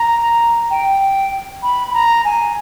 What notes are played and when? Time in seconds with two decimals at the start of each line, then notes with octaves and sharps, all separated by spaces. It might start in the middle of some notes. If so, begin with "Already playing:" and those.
Already playing: A#5
0.71 G5
1.63 B5
1.88 B5
1.94 A#5
2.25 G#5